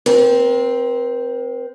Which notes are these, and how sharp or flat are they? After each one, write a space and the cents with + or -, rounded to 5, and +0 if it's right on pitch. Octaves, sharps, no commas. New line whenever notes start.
C4 +0 A#4 +45